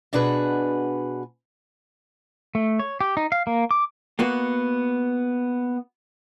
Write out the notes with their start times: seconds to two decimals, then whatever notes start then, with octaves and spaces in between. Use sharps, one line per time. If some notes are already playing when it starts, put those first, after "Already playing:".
0.13 B2 D4 F#4 G#4 B4
2.55 A3
2.79 C#5
3.01 G4
3.17 D#4
3.32 F5
3.47 A#3
3.71 D6
4.19 A#3 B3 F#4